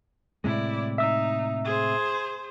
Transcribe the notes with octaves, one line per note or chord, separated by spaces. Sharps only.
A2 C3 G#3 E4 D5
D#4 E5 E6
G#4 C5